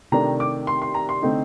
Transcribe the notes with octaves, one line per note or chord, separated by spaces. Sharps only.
C3 D#3 A3 D4 A#5
D6
C6
C6
A#5
C6
D3 A3 C4 D#4